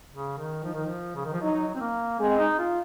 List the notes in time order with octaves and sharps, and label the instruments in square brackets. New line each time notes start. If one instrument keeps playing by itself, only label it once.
[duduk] C#3
D#3
[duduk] F3 [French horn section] D#4
[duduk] D#3
F3
C#3
D#3
F3
[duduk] F#3 [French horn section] D#4
[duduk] C4
A#3
[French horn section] G#3 [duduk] C4
[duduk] D#4
F4